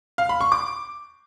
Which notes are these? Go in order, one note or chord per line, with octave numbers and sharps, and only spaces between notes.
F5
B5
C#6
D6